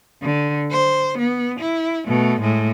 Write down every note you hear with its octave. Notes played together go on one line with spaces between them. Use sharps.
D3
C5
B3
E4
B2 A3
A2 G#3